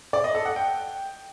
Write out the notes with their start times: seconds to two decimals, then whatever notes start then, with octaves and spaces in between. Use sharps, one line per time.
0.13 D5
0.24 D#5
0.35 A4
0.45 F#5
0.56 G5